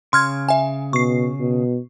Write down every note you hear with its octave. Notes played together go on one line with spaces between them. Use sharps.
C#3 C6 F6 G#6
E5 G#5
B2 C#6 C7
B2